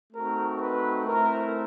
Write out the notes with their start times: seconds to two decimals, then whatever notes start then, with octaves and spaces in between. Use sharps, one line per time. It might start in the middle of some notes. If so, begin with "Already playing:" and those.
0.13 A3 C4 D#4 F#4 A#4
0.60 B4
1.06 A3 C4 E4 A#4